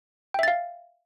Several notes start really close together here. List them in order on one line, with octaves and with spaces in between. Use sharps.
G5 E5 A6 F5